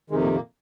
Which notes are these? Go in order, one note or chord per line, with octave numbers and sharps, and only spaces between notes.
F2 C3 D#3 G#3
A#2 A#3
A#2 A#3